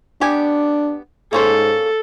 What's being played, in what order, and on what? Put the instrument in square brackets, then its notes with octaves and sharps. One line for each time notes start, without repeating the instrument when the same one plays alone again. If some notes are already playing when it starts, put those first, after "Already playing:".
[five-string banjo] B3 G4 G#5 [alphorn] D4
[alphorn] G#2 [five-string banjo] A#3 C#4 C5 [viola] A4